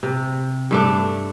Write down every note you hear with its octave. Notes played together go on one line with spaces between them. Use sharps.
C3
G2 A3 D4